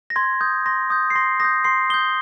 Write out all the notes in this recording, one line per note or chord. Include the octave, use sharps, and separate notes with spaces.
A#6
C6 G#6
D#6 G6
C6 A#6
D#6 G6
C7
C6 A#6
D#6 G6 A#6
C6 C7
D#6 G6 G7